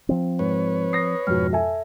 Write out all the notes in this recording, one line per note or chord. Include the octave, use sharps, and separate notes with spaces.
F3 C4
G#2 B4 C#5
D#6 A#6 C7
F2 G#2 B2 F6
A4 E5 G#5